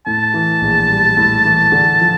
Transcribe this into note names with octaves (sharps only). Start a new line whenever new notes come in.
A2 A5
E3
A#1
G3
A2
E3
D3
F3